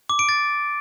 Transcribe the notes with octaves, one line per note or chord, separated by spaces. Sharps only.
D6
D7
A6